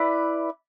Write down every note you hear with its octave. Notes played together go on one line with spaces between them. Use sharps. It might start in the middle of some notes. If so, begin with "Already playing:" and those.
Already playing: E4 B4 D5